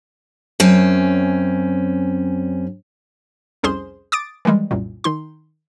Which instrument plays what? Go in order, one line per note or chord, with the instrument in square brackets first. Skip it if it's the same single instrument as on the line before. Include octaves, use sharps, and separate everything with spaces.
[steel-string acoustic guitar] F#2 C4 C#4
[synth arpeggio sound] C2 F2 C#4 G#4 C5 C6
D6 D#6 A6 D7
D#3 E3 G3 G#3
C2 F#2 A#2
D#3 D#4 C6